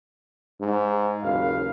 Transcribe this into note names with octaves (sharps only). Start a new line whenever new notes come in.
G#2
F#1 D#2 B4 F5